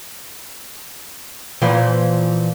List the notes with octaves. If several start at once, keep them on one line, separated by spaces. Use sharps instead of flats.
A#2 E3 F3